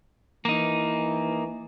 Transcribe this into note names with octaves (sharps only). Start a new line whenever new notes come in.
E3 A#3 D#4